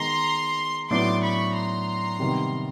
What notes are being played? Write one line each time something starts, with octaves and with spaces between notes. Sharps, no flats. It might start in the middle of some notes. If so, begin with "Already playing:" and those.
Already playing: D#3 G#3 B3 A#5 C6
A2 F#3 B3 D4 C6 D6
B5 C#6
A#5 C6
C3 D#3 G3 B3